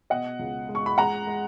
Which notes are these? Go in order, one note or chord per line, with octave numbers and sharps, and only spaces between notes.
B2 D#5 F#5
C#2
G#3
C#6
B5
G#3 F#5 A#5
G#3